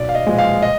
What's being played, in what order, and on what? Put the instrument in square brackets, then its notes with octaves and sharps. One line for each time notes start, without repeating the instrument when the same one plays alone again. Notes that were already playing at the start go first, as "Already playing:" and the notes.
Already playing: [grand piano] B1 D5
F5
D#5
A#2 F3 G#3
F5
D#5